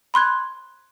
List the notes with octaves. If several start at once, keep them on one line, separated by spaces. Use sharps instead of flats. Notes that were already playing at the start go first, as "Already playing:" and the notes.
B5 C6 F#6 G#6